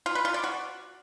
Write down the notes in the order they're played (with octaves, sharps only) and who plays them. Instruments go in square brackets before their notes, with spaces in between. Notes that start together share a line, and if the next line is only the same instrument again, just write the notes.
[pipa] F4
B4
F4
D5
F#4